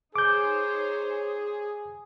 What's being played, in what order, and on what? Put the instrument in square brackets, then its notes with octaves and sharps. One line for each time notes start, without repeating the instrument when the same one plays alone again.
[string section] D#4 C5 C#5 [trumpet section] G#4 [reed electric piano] D6 G6